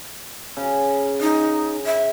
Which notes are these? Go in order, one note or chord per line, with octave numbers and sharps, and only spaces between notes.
C#3
D#4
E5